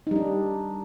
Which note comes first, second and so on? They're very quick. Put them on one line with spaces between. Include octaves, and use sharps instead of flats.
D#4 G3 D4